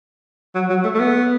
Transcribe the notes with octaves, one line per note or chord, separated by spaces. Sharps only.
F#3
F#3
A3
A3
B3